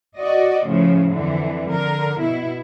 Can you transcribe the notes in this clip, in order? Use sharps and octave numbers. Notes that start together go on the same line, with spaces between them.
F#4 D5 D#5
A2 C#3 F3
F2 D3 E3
D3 A#4
B2 E4